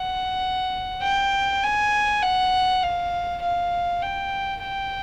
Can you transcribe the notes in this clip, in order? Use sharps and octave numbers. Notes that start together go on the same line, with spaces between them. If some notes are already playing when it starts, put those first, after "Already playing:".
Already playing: F#5
G5
G#5
F#5
F5
F5
G5
G5